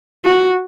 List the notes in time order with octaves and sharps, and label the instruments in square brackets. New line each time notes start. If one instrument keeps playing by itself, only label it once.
[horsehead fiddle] F#4